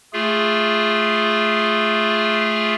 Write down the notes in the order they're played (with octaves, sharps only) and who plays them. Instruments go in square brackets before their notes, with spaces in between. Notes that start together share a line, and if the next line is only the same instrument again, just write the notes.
[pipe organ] A3 F4 G#4